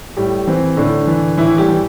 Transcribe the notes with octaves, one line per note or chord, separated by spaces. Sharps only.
A2 G3 G4
E3 C4
A2 D3 D4
E3
A2 E3 E4
G3 G4
E3